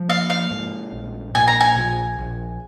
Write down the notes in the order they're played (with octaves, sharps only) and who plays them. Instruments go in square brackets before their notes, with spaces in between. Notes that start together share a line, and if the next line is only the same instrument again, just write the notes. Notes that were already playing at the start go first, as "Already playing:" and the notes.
Already playing: [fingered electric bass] F3
[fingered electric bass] A#3 [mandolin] F5
[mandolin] F5
[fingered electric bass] G#2
A#1
[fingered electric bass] A#2 [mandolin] G#5
[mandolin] A#5
G#5
[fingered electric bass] A#1
A#1